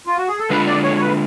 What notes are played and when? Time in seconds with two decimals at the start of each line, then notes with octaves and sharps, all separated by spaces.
0.07 F4
0.17 F#4
0.28 G#4
0.39 A4
0.50 D3 G#3 D4 F4 A4 B4
0.67 D5
0.84 C#5
0.96 C#5
1.01 B4